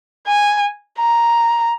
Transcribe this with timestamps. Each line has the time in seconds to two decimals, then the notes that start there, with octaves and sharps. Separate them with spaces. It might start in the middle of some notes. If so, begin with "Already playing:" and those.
0.27 G#5
0.99 A#5